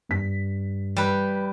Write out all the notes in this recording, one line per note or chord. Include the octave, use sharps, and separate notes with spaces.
G2 B6
G3 B4